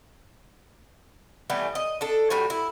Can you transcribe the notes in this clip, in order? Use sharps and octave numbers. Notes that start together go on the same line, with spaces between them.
E3 G3 A3 B3
D#5
D4 A4
A2 G3 F#4 G#5
E4